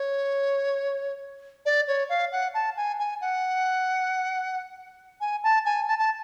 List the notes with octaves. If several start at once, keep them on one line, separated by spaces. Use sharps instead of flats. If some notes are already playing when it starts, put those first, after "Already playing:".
Already playing: C#5
D5
C#5
F5
F#5
A5
G#5
G#5
F#5
G#5
A5
G#5
A5
A5